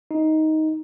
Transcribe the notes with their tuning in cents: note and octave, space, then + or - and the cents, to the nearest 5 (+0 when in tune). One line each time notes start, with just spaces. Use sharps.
D#4 +10